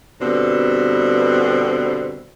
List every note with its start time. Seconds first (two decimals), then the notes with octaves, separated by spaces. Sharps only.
0.21 G2 B2 D3 C4